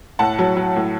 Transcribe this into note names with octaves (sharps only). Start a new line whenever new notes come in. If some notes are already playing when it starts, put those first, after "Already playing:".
A2 F#5 A5
F#3
F#3
A2